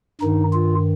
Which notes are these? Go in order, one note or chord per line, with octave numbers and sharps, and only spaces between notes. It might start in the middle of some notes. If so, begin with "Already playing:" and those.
G2 D#3 D#4
F4